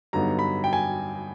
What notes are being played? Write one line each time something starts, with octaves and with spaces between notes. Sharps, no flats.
G2 D3 F#3 B3 D#4 A#5
B5
G5
G#5